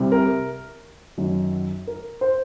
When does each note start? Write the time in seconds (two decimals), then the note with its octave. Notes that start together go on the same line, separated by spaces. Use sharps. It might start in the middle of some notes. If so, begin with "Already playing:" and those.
Already playing: C2 C3 G3
0.12 A#4
1.17 F#2 D#3 F#3
1.87 A#4
2.21 C5